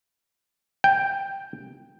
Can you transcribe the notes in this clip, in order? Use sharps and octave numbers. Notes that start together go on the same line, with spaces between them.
G5